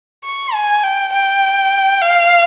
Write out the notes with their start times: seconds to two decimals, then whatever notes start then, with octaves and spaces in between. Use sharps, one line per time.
0.24 C#6
0.53 G#5
0.83 G5
1.12 G5
2.01 F5